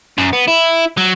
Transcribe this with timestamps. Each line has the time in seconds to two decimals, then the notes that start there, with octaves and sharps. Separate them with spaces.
0.18 F#2
0.33 B3
0.48 E4
0.98 F#3